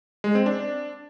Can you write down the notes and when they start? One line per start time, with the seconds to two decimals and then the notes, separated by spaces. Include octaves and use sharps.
0.24 G#3
0.35 C4
0.46 D4